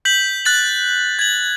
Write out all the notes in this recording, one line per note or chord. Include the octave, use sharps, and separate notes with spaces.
G6 B6 F#7
F#6 A6 F#7
G#6 F#7